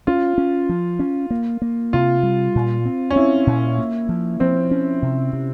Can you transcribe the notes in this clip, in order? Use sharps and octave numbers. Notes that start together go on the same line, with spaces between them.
C#4 F4
C#4
F3
C#4
A#3
A#3
C3 F4
G3
A#2
C4
C#4
C4 E4
A#2
A#3
F3
F3 C4
C#4
C3
C3